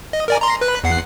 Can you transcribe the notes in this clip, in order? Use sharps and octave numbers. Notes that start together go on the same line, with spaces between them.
D#5
A#4 D5 G#5
A#5 C6
B4 F#6
E2 F#5 C7